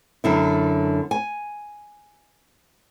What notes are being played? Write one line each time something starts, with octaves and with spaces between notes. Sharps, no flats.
F#2 D3 E4
G#5